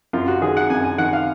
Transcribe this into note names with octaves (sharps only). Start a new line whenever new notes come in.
F#2 F4
F#4
D#3 G#4
F#5
F#2 G#5
G#5
D#3 F#5
F5